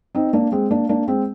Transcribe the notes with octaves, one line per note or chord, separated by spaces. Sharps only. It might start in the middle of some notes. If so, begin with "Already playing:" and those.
C4 D#4
A#3 D4
G#3 C4
A#3 D4
A#3 D4
G#3 C4